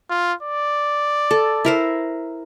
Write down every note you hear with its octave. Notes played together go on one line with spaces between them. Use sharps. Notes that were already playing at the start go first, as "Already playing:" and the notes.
F4
D5
A4
E4 A#4 C5